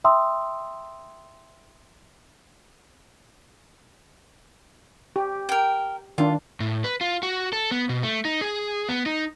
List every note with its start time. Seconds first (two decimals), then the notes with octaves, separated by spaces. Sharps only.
0.04 E5 G5 A#5 C6 D#6 E6
5.16 G4
5.49 A#4 G5
6.18 D#3 D4 F4
6.60 A2
6.84 B4
7.01 F4
7.23 F#4
7.53 A4
7.71 B3
7.89 B2
8.03 A3
8.25 D#4
8.41 G#4
8.89 B3
9.06 D#4